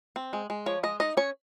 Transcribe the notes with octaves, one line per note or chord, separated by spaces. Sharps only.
C4
G#3
G#3
F3 C#5
G#3 D#5
D#4 D#5
C#4 C#5